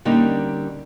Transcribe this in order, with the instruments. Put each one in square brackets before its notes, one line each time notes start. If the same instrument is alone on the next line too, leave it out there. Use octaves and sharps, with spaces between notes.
[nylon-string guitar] D3 G3 A#3 C#4 D#4